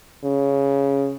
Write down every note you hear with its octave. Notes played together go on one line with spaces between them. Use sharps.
C#3